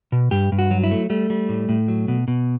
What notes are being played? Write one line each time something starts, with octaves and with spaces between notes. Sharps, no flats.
B2
G2 G4
G2
F#4
F#3
E4
A3
G3 A3
G3
A2
A2
F#3
B2
B2